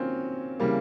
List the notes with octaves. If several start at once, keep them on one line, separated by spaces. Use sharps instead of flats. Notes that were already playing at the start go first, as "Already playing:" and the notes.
Already playing: D#3 F#3 A#3 C4 C#4 F4
C#3 E3 G3 A#3